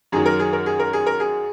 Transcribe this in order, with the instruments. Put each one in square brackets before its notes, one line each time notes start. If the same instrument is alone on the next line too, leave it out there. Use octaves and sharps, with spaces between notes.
[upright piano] F#2 D#3 F#3 G#4
A#4
G#4
A#4
G#4
A#4
G#4
A#4
G#4